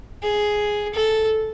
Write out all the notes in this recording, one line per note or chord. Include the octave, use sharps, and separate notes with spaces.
G#4
A4